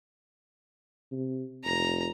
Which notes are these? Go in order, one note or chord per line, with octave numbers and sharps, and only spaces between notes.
C3
F1 A#5